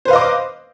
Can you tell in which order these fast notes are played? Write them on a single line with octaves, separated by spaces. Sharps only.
C5 B4 F5 D#5 D6